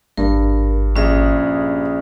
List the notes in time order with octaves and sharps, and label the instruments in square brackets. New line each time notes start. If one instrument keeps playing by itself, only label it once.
[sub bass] G#1 [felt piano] G2 [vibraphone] A#4
[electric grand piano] A#1 G#4 [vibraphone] C#4 E5